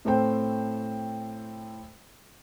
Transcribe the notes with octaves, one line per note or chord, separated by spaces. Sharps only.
A2 A3 C4 C5 G5